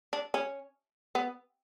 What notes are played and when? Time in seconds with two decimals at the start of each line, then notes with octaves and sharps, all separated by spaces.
0.13 D4
0.34 C#4
1.15 B3